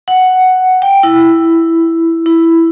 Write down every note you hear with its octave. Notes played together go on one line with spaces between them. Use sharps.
F#5
G5
E4
E4